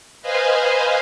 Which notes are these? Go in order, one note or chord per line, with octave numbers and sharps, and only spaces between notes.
B4 C5 D#5 F5 G#5